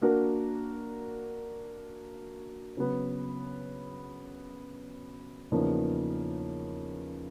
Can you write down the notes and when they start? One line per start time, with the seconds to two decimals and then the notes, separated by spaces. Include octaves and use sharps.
0.01 A#3 D4 F#4 A#4
2.77 C#3 F#3 B3
5.52 E2 C#3 F3 A#3 D#4